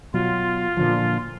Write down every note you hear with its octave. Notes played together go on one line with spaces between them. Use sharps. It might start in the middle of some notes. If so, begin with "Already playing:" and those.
B2 F#3 F4
A#2 D3 F3